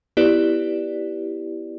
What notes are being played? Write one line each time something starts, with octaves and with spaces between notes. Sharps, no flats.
B3 E4 G4 B4 D5